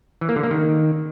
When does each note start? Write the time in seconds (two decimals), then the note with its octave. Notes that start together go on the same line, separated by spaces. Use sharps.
0.21 E3
0.29 A#3
0.36 D3
0.43 A#3
0.51 D#3